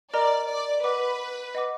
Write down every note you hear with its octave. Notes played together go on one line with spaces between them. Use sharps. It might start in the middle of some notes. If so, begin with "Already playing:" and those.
A#4 D5 D#5 A#5 F6
D5
B4 D#5 F#5 D6
D#5 F#5 D6